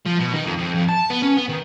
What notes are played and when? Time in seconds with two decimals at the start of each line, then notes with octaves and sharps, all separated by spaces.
0.06 F3
0.19 B2
0.34 D#3
0.46 F2
0.58 F2
0.75 F2
0.89 A5
1.10 B3
1.22 C#4
1.37 B3
1.49 D#3